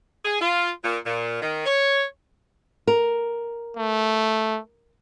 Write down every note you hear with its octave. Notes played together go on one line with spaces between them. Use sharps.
G#4
F4
A#2
A#2
D#3
C#5
A#4
A3